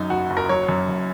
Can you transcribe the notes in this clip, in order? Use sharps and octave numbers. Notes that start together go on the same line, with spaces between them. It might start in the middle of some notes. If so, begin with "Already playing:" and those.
Already playing: F#2 F#3 D#4
F#1 F#4
F#1
A#4
F#3 C#5
F#2
F#1